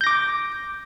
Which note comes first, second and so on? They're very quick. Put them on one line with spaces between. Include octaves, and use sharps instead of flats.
G6 A#6 D6